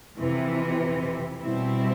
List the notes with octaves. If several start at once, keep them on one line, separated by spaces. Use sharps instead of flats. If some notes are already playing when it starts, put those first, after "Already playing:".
F2 C3 E3
B2 G3 C4 E4